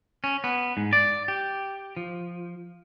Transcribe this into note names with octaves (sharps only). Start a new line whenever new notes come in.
C#4
B3
G#2
D5
G4
F3